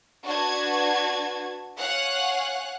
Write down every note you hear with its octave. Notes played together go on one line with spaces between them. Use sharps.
D4 F#4 B4 A5 G#6
C#5 F5 F#5 G#5 F#6